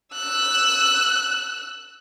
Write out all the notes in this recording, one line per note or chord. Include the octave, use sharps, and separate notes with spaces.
E6 F#6